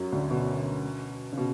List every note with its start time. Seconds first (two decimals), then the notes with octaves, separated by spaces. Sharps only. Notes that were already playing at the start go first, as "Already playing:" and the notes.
Already playing: F#2 F#3
0.12 D2 D3
0.31 B2
1.33 C#3
1.38 B2